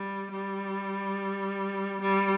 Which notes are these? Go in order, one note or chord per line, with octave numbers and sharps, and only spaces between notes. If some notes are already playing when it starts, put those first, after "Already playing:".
Already playing: G3
G3
G3